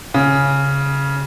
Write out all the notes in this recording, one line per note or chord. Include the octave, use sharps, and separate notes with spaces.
C#3